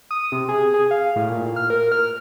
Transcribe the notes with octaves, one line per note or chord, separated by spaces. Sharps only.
D#6
C3
G#4
G#4
F5
A2
A#2
F6
A#4
F6